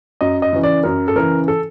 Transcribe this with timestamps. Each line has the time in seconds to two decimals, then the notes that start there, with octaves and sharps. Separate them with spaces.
0.21 F#2 D#5
0.42 D#5
0.53 C#3 E3
0.63 D5
0.83 F#2 A#4
1.08 A4
1.16 C#3 E3 A#4
1.48 A4